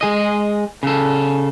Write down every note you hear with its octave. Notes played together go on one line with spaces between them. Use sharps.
G#3 G#4 D#5
C#3 A4